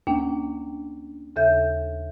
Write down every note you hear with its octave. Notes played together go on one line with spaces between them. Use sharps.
D2 A#3 C#4 D4 G5
D#2 C#3 A4 E5 G6